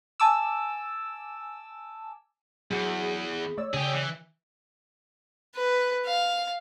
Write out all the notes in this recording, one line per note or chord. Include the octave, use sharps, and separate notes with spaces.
G#5 A5 D6 E6
E2 F#3 G#4 B5
A3 C#5 D5 E6
C#3 G4 G#4
E3
B4
F5